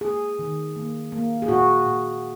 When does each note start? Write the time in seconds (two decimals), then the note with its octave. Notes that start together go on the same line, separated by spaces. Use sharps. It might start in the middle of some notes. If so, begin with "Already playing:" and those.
0.01 A#3 G#4
0.39 D#3
0.76 A#3
1.12 A#3
1.42 G#4
1.48 A#2 F#4
1.85 A#2